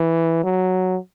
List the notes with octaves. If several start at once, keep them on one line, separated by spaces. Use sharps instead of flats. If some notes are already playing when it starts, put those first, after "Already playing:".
Already playing: E3
F#3